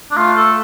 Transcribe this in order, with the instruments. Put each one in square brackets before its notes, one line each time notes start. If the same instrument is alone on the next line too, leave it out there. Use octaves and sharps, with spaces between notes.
[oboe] D4
[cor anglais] A3 [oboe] F4
[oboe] A4